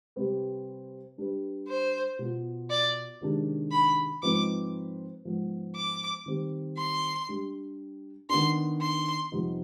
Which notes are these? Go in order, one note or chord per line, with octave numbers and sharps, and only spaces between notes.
C3 G3 C4 G4 B4
G3 D4 G4 B4
C5
B2 B3 F4
D5
C3 D#3 G#3 D4
B5
G#2 F3 C4 D#4 B4 D6
G#2 F3 B3
D6
D#3 G3 C4
C6
G3 D4 G4
D#3 B3 D4 C6
C6
F2 C3 G3 B3 D#4